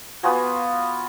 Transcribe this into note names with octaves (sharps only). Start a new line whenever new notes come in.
B3 F4 F#4 G#5